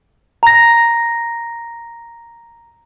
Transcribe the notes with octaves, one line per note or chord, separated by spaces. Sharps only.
A#5 A#6